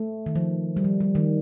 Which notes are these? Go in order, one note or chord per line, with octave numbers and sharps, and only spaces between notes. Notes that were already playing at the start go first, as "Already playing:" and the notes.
Already playing: A3
D#3
F3
G3
F3
G3
D#3